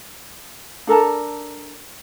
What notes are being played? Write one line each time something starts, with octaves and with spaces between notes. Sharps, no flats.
D4 A4 A#4 A5